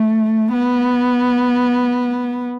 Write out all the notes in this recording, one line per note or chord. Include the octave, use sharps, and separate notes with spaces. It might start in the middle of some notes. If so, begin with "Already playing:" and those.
Already playing: A3
B3